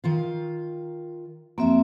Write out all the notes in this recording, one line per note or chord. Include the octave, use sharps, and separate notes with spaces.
D#3 F4 F5
F2 A#3 C4 F#4 E5